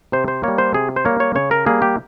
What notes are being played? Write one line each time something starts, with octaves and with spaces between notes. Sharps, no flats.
C3 C5
C5
G3 A#3 C#5
C5
C3 G#4
C5
G3 A#3 C#5
C#5
C#3 C#5
A#4
G3 A#3 G#4
G4